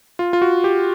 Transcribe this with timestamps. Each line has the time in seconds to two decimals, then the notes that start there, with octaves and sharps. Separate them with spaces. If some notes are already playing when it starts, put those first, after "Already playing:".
0.19 F4
0.33 F4
0.42 F#4
0.64 G4